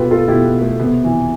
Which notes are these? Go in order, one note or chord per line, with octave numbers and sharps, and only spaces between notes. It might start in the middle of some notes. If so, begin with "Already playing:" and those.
Already playing: B2 F4 G4 A4 B4
F4 A4
B2 E4 G4
B3
A3
C3 B3
E3